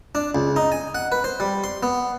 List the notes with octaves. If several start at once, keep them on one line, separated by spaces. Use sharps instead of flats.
D4
C#2
D#4
G#5
F#5
B4
C5
G3
C6
B3